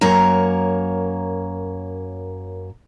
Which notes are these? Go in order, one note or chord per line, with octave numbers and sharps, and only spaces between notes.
F#2 A#3 C#5 A#5